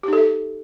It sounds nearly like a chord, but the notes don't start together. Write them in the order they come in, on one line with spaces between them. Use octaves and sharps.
G4 D#4 A4 E5